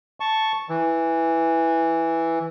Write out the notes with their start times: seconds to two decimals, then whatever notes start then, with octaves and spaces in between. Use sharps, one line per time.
0.20 A5 C#6
0.69 E3